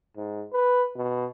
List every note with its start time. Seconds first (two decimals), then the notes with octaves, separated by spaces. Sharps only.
0.16 G#2
0.53 B4
0.96 B2